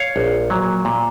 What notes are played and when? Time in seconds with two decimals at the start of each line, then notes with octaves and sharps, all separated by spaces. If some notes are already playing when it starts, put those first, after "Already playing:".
Already playing: C#5 F5
0.16 A#1
0.50 A#2 F#3 A#3
0.85 A#2